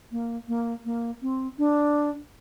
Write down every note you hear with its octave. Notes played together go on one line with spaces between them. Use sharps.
A#3
A#3
A#3
C4
D4